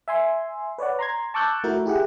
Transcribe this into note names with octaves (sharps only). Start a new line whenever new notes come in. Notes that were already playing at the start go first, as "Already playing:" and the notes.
E5 G#5 C6
B4 C#5 D5 F#5
A#5 C6 G#6
A5 C#6 D6 E6 F#6 G6
A3 E4 F#4 A#4
E4 G4 G#4 F#5